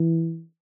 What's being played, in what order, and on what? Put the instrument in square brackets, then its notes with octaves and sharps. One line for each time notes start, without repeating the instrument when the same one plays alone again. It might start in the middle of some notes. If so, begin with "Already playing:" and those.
Already playing: [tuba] E3